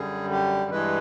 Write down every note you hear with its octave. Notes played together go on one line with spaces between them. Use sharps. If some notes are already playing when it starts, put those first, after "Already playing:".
Already playing: F#2 D3 G3 G#4
G4
G2 E3 G#3 B4